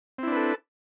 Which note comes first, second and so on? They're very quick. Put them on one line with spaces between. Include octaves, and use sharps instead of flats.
C4 E4 D4 B4 A4